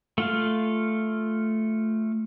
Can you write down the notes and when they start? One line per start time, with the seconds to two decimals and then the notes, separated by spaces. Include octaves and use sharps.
0.18 A3 F4 F5